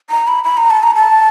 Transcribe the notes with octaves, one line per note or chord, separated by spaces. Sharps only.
A#5
B5
B5
A#5
A5
A#5
A5